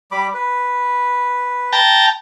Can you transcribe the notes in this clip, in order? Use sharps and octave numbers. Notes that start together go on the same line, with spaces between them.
G3 B5 D6
B4
G5 A5 A#5